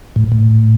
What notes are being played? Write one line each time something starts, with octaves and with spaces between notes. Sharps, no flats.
A2
A2